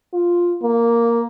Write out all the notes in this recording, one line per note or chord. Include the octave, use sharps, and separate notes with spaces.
F4
A#3